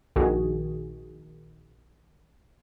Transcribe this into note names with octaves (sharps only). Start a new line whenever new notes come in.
A#1 D#3 F#4 G#4